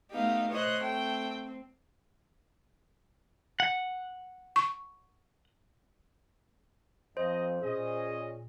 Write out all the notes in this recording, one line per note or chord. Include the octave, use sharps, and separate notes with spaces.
A3 B3 D#4 G4 F5
C5 C#5 D#5 F#6
A3 C4 G5
F#5
C#6
F2 C5 D#5
A#2 C#4 G#4 D#5